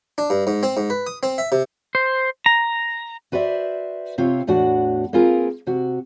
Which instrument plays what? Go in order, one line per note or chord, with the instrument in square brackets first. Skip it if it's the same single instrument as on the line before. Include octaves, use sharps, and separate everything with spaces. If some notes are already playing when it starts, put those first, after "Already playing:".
[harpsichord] D4
G2
G#2
C4
G#2
B4
D#6
C4
E5
C3
[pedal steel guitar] C5
A#5
[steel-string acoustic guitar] F#4 B4 C5 D5 E5
C3 C4 F4 C#5
E2 A2 D4 F#4 F#5
A#3 C4 F4 G#4 A#4 B4
C3 F#4